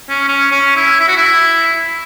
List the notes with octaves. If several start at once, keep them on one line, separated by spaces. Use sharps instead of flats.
C#4
C#4
C#4
E4
E4
F#4
E4